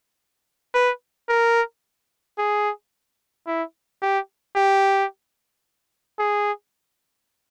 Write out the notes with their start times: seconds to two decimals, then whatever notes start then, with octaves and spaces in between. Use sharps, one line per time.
0.75 B4
1.29 A#4
2.38 G#4
3.47 E4
4.02 G4
4.56 G4
6.19 G#4